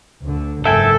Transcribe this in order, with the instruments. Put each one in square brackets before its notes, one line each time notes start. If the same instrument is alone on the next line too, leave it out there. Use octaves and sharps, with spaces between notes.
[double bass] D2 D3
[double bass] F#1 G#2 [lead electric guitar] A4 [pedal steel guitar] E5 G5 G#5